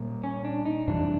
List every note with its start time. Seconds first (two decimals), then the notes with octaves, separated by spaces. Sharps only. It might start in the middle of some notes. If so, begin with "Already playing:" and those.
Already playing: A#2 G3 A#3
0.24 C#4
0.45 D4
0.65 D#4
0.87 F2 C3 E3 G3 D4